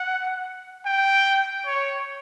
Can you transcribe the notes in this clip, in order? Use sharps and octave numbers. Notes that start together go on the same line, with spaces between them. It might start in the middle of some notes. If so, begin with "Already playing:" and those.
Already playing: F#5
G5
C#5